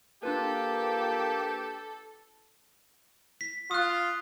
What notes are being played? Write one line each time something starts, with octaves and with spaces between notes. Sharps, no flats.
A#3 D4 F4 G4 A4 B4
B6
F4 D#6 F#6